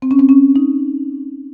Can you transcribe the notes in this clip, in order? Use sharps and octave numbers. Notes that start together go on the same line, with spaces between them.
C4
C#4
C4
C#4
D#4